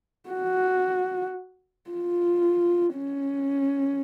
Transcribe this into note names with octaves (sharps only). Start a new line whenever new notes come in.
F#4
F4
C#4